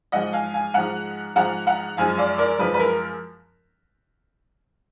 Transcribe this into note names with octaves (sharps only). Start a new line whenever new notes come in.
G#2 F3 G#3 D#5 F#5
F5 G#5
F5 G#5
G#2 F3 G#3 F#5 A#5
G#2 F3 G#3 F#5 A#5
F#5 A#5
F#2 F3 G#3 F5 G#5
D5 F5
A#4 D5
F#2 F3 G#3 B4
B4
A#4